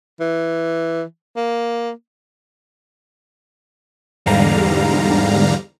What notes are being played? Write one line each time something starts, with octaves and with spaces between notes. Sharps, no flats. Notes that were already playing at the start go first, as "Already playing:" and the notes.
E3
A#3
E2 G#2 D3 G3 F5 A#5